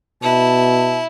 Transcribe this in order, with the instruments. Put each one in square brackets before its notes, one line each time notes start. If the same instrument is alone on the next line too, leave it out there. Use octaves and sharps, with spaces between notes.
[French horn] B2 [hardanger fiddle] E4 [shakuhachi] A5